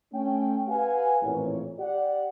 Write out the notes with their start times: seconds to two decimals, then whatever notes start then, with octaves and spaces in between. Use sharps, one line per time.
0.13 A3 C#4 G5
0.68 G4 B4 F5 F#5 G#5
1.22 A1 F2 A#2 E3 A#3 C#5
1.79 G4 D5 F#5